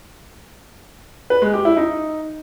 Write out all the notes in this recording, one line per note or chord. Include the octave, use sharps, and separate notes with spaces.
B4
G#3
G4
E4
D#4